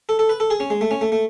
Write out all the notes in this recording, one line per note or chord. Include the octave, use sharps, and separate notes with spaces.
A4
A4
B4
A4
G#4
C#4
G#3
A3
C#4
A3
A3